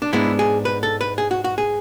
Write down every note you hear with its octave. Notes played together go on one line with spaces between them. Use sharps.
D4
G#2 G#3 B3 D4 E4
G#4
B4
A4
B4
G#4
F#4
F#4
G#4